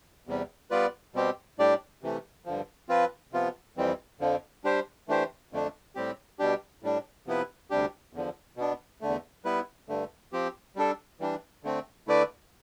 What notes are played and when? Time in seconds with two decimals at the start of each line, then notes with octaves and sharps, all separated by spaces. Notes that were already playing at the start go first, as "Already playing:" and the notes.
0.27 E2 C3 G3
0.71 G3 B3 F4 B4 D5
1.15 B2 G3 C4 G4
1.59 A2 G3 D4 G4 D5
2.03 C3 E3 A3
2.46 G2 D3 F3
2.89 F3 C4 F4 B4
3.33 C3 F3 B3 F4
3.77 F2 E3 G3 C4
4.21 F2 D3 F3
4.64 G3 D4 G4 C5
5.08 E3 A3 D4 G4 C5
5.52 F2 D3 A3 D4
5.95 A2 G3 C4 G4
6.39 B2 G3 D4 G4
6.83 A2 G3 D4
7.27 C3 F3 B3 E4 B4
7.71 D2 C3 G3 D4 G4
8.13 E2 D3 F3
8.57 B2 B3 D4
9.01 E2 D3 A3
9.45 G3 B3 E4 B4
9.89 G2 D3 A3
10.33 F3 C4 G4
10.76 G3 D4 A4
11.20 E3 G3 D4
11.64 D3 A3 C4
12.07 D3 A3 E4 B4 D5